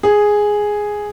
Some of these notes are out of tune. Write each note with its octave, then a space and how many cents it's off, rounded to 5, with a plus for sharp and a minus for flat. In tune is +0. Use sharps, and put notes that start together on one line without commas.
G#4 +0